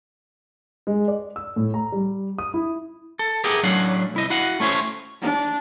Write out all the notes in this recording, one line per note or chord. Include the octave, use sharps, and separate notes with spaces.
G#3
D5
E6
A2
A#5
G3
D#6
E4
A4
B3 E4 G4 G#4 A#4
A2 F#3 C#4 D4 F5 F#5
C2 E4 D#5
E4 F#4 F5 F#5
A3 C#4 E4 C5 C#5
D4